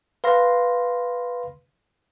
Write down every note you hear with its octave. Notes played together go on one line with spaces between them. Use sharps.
B4 F5 C6 A#6